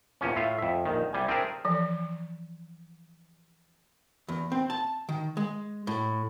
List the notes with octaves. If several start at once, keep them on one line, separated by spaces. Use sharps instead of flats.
E2 A#2 F3 C#4
A2 F4 E5 F5
F2 E5
A#1 D#3
C2 G3 G#5
C4 D4 G#4 A#4 E5
E3 F3
E2
C4
A5
D#3
G#3
A2